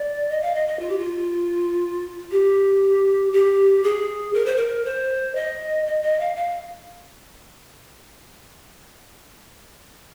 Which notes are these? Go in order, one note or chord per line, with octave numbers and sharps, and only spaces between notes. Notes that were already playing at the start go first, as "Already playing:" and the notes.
Already playing: D5
D#5
F5
D#5
D#5
F4
G4
F4
G4
G4
G#4
A#4
C5
A#4
C5
D#5
D#5
D#5
F5
F5